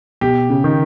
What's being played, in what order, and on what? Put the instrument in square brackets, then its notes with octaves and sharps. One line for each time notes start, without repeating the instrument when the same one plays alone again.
[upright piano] B2 [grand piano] G4
[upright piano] C#3
[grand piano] D#3